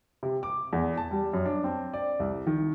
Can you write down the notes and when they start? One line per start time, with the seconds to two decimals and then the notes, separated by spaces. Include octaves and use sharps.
0.23 C3
0.43 D6
0.73 E2
0.97 A5
1.11 G3
1.33 F#2
1.45 D4
1.64 C4
1.94 D5
2.20 C2
2.47 D#3